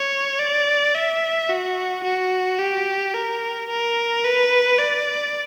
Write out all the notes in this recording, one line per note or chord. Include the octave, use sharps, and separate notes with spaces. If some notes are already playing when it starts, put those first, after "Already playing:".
Already playing: C#5
D5
E5
F#4
F#4
G4
A#4
A#4
B4
D5